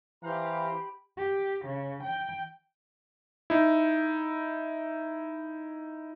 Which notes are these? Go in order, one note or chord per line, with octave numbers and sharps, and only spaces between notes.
E3 G4 C5 F5 A#5 B5
G4
C#3
G5
D#4 E4